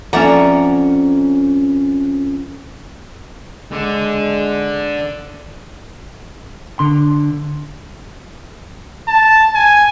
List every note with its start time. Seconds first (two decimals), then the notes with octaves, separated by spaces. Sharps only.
0.13 F2 C#4 D5 E5 F#5 A#5
3.72 D3 G#3
6.79 D3 C6
9.08 A5
9.55 G#5